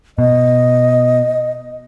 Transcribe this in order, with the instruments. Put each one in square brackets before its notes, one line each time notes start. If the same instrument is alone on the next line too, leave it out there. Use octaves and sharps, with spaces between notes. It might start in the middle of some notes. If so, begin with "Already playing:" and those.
[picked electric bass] B2 [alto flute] D#5